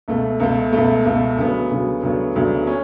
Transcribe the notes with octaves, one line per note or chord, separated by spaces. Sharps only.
C#2 B2 A3
C#2 B2 A3
C#2 B2 A3
C#2 B2 A3
D2 C#3 F#3 B3
D2 C#3 F#3 B3
D2 C#3 F#3 B3
D2 C#3 F#3 B3
C#4